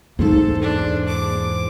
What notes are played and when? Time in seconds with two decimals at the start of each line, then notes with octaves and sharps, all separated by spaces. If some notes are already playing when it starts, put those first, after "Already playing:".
0.19 E2 G#2 A#3 D#4 A4 C5
0.62 D4
1.08 D6